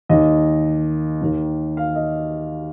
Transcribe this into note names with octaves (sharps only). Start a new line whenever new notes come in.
D#2 D#3 D#5
D#2 D#3
F5
D#5